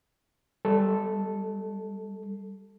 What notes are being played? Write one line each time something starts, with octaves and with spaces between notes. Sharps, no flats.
G3 A4